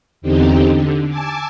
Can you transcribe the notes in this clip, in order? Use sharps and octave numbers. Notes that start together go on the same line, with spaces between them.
E2 D3 C4 D#4 G4
D3
G#5 A5 D6 E6